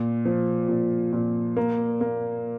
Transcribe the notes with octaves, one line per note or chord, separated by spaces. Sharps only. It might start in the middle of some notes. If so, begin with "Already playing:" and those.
Already playing: A#2
F3
A#2
A#2
A#3
A#3